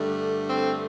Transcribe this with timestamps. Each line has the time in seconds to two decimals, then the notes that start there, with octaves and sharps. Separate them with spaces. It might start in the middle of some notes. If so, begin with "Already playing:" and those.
Already playing: G2 D3 A3
0.49 C4